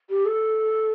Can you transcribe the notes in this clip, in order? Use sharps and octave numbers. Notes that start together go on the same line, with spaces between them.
G4
A4